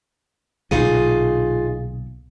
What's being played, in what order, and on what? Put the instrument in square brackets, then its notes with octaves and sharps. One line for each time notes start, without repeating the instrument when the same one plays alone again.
[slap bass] B1 A#2 D3 [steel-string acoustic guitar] D#4 F4 G#4